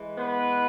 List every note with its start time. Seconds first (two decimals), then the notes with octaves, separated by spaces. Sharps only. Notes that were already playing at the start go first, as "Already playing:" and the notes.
Already playing: E3 G#3
0.16 B3 B4